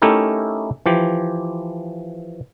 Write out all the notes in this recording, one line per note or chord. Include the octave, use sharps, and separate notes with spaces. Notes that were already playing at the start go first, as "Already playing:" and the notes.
A3 C#4 D#4 E4 G4 A#4
E3 F3 G4